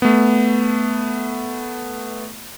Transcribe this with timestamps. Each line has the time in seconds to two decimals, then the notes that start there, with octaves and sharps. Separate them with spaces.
0.02 A3 B3